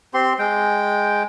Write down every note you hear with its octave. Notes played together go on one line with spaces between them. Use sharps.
C4 G4 C6
G#3 G5